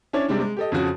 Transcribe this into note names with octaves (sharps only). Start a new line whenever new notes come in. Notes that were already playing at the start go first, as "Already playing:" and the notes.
C#4 D4 E4 C#5 D5
C3 G3 G#3 C4 D4
G#3
G4 A4 D#5
F2 C#3 F3 F#4 C#5